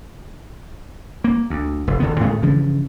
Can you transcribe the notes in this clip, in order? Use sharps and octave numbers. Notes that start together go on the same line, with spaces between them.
A#3
D2
F1
E1 D3 D#3 B3
A2 G#3 A3 B3
G2 C#3 E3 F3